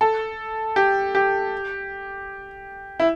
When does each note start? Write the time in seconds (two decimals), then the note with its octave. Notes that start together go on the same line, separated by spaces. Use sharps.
0.01 A4
0.76 G4
1.15 G4
3.00 E4